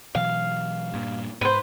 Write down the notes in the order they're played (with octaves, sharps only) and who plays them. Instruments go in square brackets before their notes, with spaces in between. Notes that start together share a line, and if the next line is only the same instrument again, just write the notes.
[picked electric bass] B2 E3 F#3 [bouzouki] F5
[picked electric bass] G2 A#2
[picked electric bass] G#2 [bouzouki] B4 C5